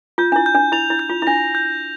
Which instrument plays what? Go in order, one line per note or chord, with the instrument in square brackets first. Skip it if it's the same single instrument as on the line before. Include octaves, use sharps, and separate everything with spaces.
[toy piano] F4 [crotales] G6
[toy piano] D4
E4
[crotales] G6
[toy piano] D4
[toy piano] E4 [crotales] F7
[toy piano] E4
[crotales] G6
[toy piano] F4
E4
[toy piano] D4 [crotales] A#6
[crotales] G6